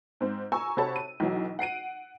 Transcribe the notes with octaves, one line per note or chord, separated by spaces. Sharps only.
G#2 C4
G#5 A#5 C#6 E6
C3 F#4 A4 C#5 A5 B5
D#7
B1 E3 F#3
F#5 C7 D7 D#7